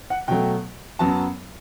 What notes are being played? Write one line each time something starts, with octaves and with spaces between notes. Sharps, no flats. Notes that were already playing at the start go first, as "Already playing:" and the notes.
F#5
B2 F#3 A3 G5
F#2 F#3 B3 A5